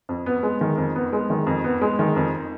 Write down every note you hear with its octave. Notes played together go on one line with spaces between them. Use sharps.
F2
B3
G#3
D#3
F2
B3
G#3
D#3
F2
B3
G#3
D#3
F2